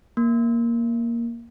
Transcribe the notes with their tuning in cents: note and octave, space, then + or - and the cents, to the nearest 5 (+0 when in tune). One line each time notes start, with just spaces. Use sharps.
A#3 +5